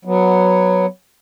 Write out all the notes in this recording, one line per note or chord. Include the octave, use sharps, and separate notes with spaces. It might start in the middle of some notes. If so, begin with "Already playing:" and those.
F#3 B3